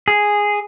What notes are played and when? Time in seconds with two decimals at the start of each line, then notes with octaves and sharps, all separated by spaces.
0.08 G#4